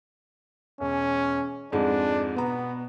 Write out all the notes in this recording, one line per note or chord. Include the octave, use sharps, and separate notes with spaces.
E1 C#4
F2 G#2 G#3 D4
B2 B3 A#5